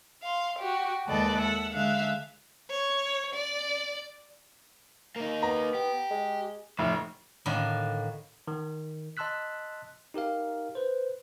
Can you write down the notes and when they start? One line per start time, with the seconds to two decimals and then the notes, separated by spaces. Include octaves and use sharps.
0.21 F5 C6
0.59 F#4 G4
1.07 D#2 G#3 A4 B4 D5 D#5
1.39 E5 F#5 E6
1.72 D3 G#3 E5 F5 F#6
2.70 C#5
3.33 D5
5.16 A#3 D#4
5.43 B3 A#5
5.75 G4
6.10 G#3
6.79 F1 A2 E4
7.46 A2 D3 D#3 A#3 D4
8.47 D#3
9.17 D#5 A5 C6 E6 F#6 B6
10.14 D#4 G4 A#4 F5
10.75 B4 C5